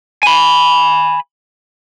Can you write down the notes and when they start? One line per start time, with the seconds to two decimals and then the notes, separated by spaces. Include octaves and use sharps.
0.23 G#5 B5